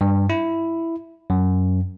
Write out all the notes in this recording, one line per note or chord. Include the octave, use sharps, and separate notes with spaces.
G2
E4
F#2